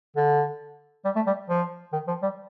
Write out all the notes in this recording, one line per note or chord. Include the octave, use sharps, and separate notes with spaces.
D3
G3
A3
G3
F3
D#3
F3
G3